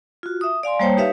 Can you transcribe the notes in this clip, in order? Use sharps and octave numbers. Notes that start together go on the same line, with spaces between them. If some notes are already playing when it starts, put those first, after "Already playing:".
F4 F#4
E5 D#6
D5 F5 G#5 C6
G3 A#3 C5 C#5 G5 A5
D#4 G4 B4 C#5 E5 F5